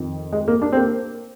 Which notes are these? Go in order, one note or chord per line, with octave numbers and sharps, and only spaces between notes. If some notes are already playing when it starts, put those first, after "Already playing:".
Already playing: F2 D#3
G#3
A#3
D4
C4
A#3